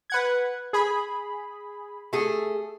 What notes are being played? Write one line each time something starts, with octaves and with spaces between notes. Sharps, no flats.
B4 F#5 G#6
G#4 B5
A3 G#4